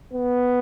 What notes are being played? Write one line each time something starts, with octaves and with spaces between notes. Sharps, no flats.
B3